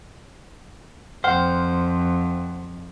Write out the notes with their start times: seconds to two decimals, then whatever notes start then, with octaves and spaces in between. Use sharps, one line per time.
1.24 F2 C5 F#5 G5 F6